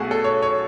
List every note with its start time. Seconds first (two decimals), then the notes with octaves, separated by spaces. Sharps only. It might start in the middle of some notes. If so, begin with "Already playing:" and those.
Already playing: B1 B2 A3 F#4 G#4
0.11 A4
0.24 C#5
0.42 C#5